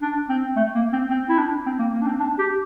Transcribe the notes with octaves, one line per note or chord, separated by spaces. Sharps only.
D4
C4
A3
A#3
C4
C4
E4
D4
C4
A#3
A#3
D4
C4
D4
G4